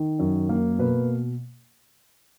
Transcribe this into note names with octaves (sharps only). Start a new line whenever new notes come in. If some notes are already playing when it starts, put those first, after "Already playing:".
Already playing: D#3
F#2
A#3
B2 B4